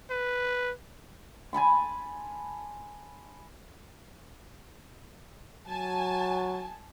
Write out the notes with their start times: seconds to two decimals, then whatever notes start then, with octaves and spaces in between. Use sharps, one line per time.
0.11 B4
1.53 G#5 A5 B5 C6
5.68 F#3 G#5 A5